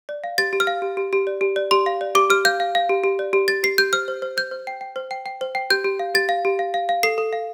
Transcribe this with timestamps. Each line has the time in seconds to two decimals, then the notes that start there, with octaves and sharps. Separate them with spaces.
0.09 D5
0.24 F5
0.38 G4 A6
0.53 G4
0.60 F6
0.67 F5
0.82 G4
0.97 G4
1.13 G4
1.27 D5
1.41 G4
1.56 D5
1.71 G4 C6
1.86 F5
2.01 D5
2.15 G4 D6
2.30 G4 F6
2.45 F5 G6
2.60 F5
2.75 F5
2.89 G4
3.04 G4
3.19 D5
3.33 G4
3.48 G4 A6
3.63 G4 C7
3.78 G4 G6
3.93 C5 F6
4.08 C5
4.22 C5
4.37 C5 G6
4.51 C5
4.67 G5
4.81 G5
4.96 C5
5.11 G5
5.26 G5
5.41 C5
5.55 G5
5.70 G4 G6
5.84 G4
5.99 F5
6.15 G4 A6
6.29 F5
6.45 G4
6.59 F5
6.74 F5
6.89 F5
7.03 A4 C7
7.18 A4
7.33 F5